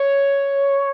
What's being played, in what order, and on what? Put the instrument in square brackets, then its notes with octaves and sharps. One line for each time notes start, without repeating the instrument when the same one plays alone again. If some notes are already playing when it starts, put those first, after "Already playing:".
Already playing: [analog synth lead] C#5